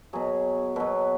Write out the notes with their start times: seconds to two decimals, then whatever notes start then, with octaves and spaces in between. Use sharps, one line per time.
0.13 B2 F#3 G#4
0.76 B2 F#3